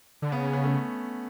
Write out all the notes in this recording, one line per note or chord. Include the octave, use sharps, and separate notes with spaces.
D3
C#3 B3
C#4
B3
A3